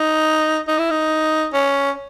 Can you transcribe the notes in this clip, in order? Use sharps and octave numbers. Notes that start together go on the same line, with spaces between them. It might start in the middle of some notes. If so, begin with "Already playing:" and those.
Already playing: D#4
D#4
E4
D#4
C#4